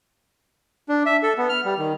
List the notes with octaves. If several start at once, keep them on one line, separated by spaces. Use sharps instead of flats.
D4
E5
A4
B3
F6
G3
D#3